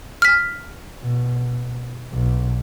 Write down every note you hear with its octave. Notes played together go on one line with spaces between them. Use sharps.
F6 B6
B2
B1